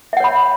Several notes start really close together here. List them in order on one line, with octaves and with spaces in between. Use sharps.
E5 F#5 C#5 B5